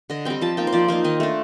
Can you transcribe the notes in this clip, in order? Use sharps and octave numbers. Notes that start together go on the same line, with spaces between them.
D3 D#5
G3 C4 G5
F3 A5
A#3 D#4 G5
C5
F3 D5
A#3 D#4 C5
D#3 D#5
A3 D4